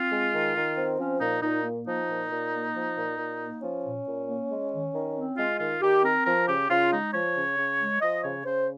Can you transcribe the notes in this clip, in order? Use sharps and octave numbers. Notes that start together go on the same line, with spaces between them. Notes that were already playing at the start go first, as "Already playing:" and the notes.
Already playing: C4 F4
G#3
D#3
D#3
C4
F3 C#4
A#2 D#4
A#2 D#4
A#3
F3 D#4
A#2
A#2
A#3
F3
A#2
A#2
A#3
F3 C#4
A#2
A#2
A#3
G#3
D#3
D#3
C4
G#3 F4
D#3 F4
D#3 G4
C4 A#4
F3 A#4
C#3 G4
C#3 F4
G#3 D#4
F3 C#5
C#3
C#3
G#3
F3 D#5
C#3 C#5
C#3 C5